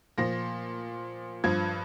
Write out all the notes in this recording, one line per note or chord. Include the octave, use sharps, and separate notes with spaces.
A#2 F3 A#6
G2 F3 G#6